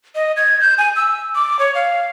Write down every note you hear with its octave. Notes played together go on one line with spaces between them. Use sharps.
D#5
G#6
G6
G#5
E6
D6
C#5
F5